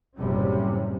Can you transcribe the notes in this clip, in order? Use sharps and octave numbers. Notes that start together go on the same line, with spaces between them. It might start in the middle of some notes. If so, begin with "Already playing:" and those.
F#1 A2 C3 G3 C#4